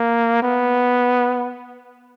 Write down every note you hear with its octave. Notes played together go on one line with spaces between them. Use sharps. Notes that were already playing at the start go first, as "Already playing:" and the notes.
Already playing: A#3
B3